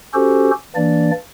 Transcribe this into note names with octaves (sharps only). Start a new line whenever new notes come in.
C#4 F#4 G4 A4 C5
E3 A#3 D4 D5